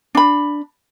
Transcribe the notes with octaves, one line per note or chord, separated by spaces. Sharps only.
D4 B5